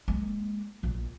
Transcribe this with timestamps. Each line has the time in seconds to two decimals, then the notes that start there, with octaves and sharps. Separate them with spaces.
0.08 G#3 A#3
0.83 A#1 A#2